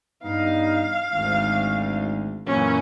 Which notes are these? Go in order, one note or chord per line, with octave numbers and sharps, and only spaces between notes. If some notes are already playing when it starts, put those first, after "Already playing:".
G2 B3 D#4 F5
G#1 D2
F#2 A#2 E3 C#4